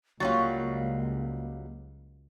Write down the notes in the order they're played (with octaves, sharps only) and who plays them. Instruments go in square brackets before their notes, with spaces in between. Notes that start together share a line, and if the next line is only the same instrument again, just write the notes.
[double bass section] C#2 [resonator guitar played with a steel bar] F#3 G3 F4 [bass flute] A#3 [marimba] C#5 A6